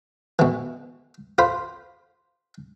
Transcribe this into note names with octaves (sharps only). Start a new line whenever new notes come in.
B2 E3
F4 C5 B5